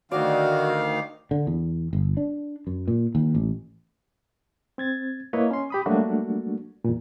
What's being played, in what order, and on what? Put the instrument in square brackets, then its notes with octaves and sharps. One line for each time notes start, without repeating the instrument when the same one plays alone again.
[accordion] D2 D#3 F5 [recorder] F#4 [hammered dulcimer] D5 D#5
[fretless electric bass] D3
E2
G1
D4
F#2
A#2
D#2
A1
[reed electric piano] C4 G#6 A6
A#3 E4 B4 C#5 D#5
C#4 C6
G4 B5 D#6
F#3 G3 A3 A#3 D4 F#4
E2 A#2